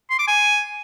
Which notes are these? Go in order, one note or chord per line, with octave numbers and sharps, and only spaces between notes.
C6
D6
G#5